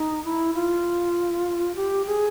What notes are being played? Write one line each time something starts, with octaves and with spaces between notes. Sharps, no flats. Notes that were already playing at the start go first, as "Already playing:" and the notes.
Already playing: D#4
E4
F4
G4
G#4